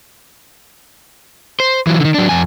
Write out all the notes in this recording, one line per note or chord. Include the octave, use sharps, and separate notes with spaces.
C5
E3 F#3
D3 D#3
F#3 D4
F2 G#5